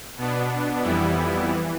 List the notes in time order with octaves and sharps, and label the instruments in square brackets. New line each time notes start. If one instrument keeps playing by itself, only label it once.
[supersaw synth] B2 B3 D4
F2 E3 G3 B3 E4
E3